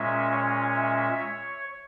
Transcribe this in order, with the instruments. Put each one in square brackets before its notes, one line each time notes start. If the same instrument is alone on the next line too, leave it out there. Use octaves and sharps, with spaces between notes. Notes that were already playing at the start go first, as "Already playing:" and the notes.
Already playing: [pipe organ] A#2 G#3 C#4 E5
C#5
E5
C#5